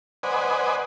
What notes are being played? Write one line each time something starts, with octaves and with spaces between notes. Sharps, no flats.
B4 C5 D5 D#5 F#5 G#5